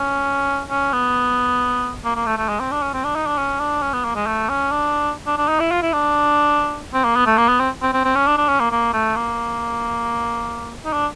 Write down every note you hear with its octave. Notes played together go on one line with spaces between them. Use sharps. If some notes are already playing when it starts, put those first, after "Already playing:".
Already playing: C#4
C#4
B3
A#3
A#3
A3
A3
G#3
C4
D4
C#4
C4
D4
D#4
D4
C#4
D4
C#4
B3
A#3
G#3
A3
C#4
D4
D4
D4
D#4
E4
F4
E4
D4
C4
A#3
B3
A3
A#3
B3
C4
C4
C4
C4
C#4
D4
D4
C#4
A#3
A#3
A3
A#3
D#4
D4